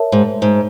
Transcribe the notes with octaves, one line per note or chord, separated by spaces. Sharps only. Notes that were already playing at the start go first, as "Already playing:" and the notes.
Already playing: A#4 C#5 E5 A5
G#2
G#2